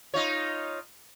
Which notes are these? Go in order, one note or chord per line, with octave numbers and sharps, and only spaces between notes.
D#4 F4 C#5